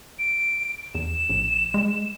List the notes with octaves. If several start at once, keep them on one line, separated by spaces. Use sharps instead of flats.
D7
E2 E7
A#1
G#3